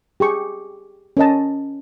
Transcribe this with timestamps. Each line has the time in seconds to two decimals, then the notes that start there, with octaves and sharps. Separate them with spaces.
0.20 G4 G#4 C#6
1.17 C#4 A#4 D#5 A5